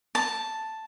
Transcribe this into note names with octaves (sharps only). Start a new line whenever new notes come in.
A5